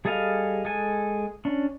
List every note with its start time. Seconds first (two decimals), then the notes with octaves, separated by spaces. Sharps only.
0.05 G3 G#4 A4 D#5 F5
0.65 G#3 A4 G#5
1.45 C#4 D4